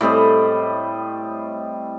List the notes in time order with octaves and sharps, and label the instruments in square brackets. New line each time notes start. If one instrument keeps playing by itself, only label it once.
[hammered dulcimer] A2 G3 C4 D#5